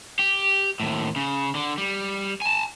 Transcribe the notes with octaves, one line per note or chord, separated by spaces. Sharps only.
G4
D#2 A2
C#3
D3
G3
G#5 A5